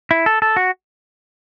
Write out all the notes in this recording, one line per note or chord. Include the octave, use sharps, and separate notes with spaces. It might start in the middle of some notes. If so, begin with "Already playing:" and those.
E4
A4
A4
F#4